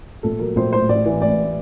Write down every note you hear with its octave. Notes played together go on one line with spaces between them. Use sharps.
A#1 A4
F#3 A#4
A#1 C5
A2 C5
A1 D5
E3
A1 D5